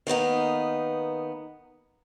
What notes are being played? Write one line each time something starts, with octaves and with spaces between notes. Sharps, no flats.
D#3 A#3 B3 D#4